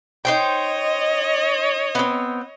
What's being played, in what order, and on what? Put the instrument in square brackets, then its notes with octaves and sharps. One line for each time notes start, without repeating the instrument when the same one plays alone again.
[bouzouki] D#4 C5 G5 [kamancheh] C#5 D#5
[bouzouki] B3 C4